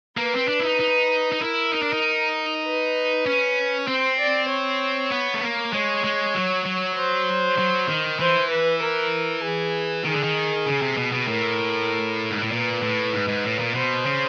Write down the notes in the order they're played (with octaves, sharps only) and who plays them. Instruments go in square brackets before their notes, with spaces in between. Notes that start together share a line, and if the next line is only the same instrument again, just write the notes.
[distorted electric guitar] A#3 [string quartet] B4
[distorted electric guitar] C4
D4
E4
D#4
D#4
D#4
[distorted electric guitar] E4 [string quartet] A#4
[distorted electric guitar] D#4
D4
D#4
[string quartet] B4
[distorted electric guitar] C#4
[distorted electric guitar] C4 [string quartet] C5
[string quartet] D5
C#5
[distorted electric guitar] B3
A3
A#3
[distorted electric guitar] G#3 [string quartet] C#5
[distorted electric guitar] G#3
F#3
F#3
[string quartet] C5
[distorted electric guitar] F#3
D#3
[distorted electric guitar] E3 [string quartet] C5
[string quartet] B4
A#4
G#4
[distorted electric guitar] D#3 [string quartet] G#4
[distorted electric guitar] D3
D#3
C#3
C3
B2
B2
[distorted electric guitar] A2 [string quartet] A#4
[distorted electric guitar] G#2
A2
[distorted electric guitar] A#2 [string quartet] B4
[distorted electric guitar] A2
G#2
G#2
A2
A#2
[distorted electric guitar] B2 [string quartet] C5
[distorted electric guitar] C#3